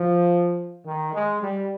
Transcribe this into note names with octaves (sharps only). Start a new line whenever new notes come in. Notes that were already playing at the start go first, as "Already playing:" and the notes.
Already playing: F3
D#3
G#3
G3